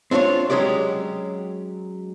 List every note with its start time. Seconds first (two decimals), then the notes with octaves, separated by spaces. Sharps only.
0.11 C4 D4 F4 C5 C#5
0.50 F#3 G#3 C#4 G4 D5